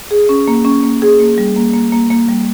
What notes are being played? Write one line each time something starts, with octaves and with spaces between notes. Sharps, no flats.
G#4
C#4
A#3
C#4
A#3
G#4
A#3
G3
A#3
A#3
A#3
A#3
G3